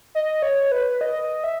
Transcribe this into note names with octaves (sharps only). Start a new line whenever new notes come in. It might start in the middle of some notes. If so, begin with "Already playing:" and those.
D#5
C#5
B4
D#5
E5